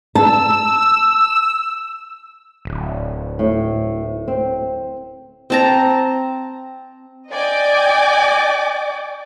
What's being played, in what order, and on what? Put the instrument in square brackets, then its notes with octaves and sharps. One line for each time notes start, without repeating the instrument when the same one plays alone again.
[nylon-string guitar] A5 [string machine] E6
[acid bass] D1
[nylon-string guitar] A2
C4
[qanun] C4 A5 A#5
[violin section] D5 D#5 G5 G#5 D6